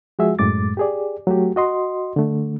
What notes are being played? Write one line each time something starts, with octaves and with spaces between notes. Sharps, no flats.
F3 G#3 F#4 G#4 E5
F#2 A2 G#3 D6 A6
G4 G#4 D5
F#3 A3 F#4 G4
F#4 D#5 C6
D3 A3